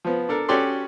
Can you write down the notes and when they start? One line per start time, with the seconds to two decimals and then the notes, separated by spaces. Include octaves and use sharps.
0.05 F3 B3
0.29 D4 A4 A#4
0.49 C#4 F#4 G4 A4 D5 C6